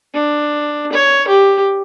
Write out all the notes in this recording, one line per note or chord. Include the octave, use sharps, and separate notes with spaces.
D4
C#5
G4